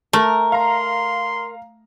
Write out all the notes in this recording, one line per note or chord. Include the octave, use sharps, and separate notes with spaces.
A3 A#4
F5 A#5 C6